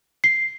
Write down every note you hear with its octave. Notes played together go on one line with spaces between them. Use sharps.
C7